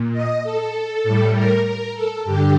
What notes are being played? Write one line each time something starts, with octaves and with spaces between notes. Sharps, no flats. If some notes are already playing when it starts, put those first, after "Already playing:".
Already playing: A#2
D#5
A4
A2 G3
A#4
A#4
A4
G2 D3 G4